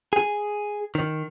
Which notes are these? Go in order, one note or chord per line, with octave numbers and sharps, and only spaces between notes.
G#4
D#3